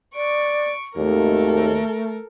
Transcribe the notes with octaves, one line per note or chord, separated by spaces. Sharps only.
D5 C#6 D7
G#1 D#2 A3 A4 A#4